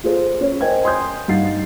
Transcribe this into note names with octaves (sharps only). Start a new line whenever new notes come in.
F4 G#4 A4 C5
C#4 C#5
A#4 C5 D#5 G5 G#5 G#6
G#5 C6 D#6 G6
G2 D#4 F5 F#5 A6 C7